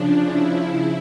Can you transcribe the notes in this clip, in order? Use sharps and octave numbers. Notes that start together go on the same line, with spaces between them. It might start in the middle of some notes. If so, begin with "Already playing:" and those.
Already playing: C#3 F3 D4
E4